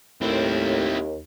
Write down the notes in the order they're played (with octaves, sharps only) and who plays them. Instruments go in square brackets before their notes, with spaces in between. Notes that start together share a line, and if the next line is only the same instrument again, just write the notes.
[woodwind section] D#2 [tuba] A2 [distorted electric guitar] C4 E4